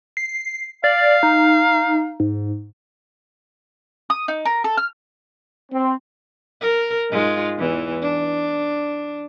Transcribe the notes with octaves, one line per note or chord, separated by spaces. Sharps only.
C7
D5 F5
D#4
G#2
D#6
D#4
A#4
A4
F6
C4
A#4
G#2 G#3 F4
E2 E3
D4